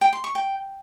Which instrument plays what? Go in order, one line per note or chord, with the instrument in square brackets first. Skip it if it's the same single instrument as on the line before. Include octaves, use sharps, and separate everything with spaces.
[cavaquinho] G5
C6
C#6
G5